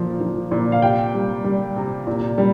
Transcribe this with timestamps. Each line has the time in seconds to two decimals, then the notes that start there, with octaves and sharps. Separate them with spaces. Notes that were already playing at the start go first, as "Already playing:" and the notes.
Already playing: A#2 F3
0.20 F3
0.51 A#2
0.72 F5
0.82 C3 G5
1.14 G3
1.44 G3
1.76 C3
2.07 A#2
2.38 G3